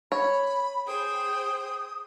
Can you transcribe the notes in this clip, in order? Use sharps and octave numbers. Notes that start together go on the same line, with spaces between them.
C#5 B5
G#4 C5 G5 D#6